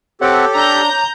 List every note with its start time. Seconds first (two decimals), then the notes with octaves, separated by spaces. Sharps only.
0.21 C4 G4 A4 C#5 F#5 D6
0.55 D4 A#5 G6